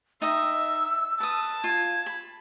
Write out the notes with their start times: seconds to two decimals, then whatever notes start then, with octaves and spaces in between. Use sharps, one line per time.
0.22 D#4 D#5 E5 G5 E6
1.20 B4 A5 D#6
1.64 F4 G#6
2.06 B5